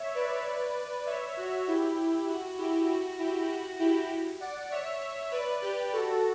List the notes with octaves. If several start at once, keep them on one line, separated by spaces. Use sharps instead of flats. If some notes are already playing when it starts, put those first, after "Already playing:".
Already playing: C#5 E5
B4 D5
C#5 E5
F#4
E4 G4
F#4
E4 G4
F#4
E4 G4
F#4
E4 G4
D5 F#5
C#5 E5
B4 D5
G4 B4
F#4 A4